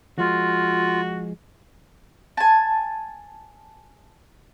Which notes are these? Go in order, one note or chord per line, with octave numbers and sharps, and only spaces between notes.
F3 G#3 F4 F#4
G#5 A5